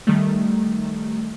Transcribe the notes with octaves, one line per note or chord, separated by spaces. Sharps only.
D#3 G3 A3